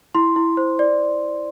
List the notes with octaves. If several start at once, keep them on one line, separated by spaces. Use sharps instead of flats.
E4 C6
E4
C5
D5